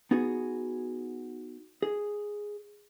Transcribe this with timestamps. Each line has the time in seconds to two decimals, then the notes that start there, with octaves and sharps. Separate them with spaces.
0.11 B3 D#4 F#4 G#4
1.82 G#4